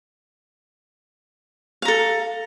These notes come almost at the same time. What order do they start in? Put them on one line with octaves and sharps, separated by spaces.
F5 A#5 A4